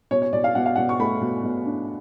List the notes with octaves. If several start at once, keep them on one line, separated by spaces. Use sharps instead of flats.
B2 C#5
C#5
B2 D5
F5
B2 F#5
F5
B2 F#5
C#6
A3 B5
B2
B2
D4